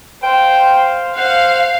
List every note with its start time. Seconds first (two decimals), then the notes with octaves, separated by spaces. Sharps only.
0.23 C5 F5 G5
1.16 C5 F5 F#5